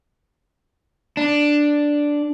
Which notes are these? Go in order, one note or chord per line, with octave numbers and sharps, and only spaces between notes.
D4